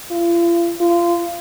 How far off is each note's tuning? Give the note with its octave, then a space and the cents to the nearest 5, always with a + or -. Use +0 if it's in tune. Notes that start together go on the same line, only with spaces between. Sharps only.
F4 -40
F4 -25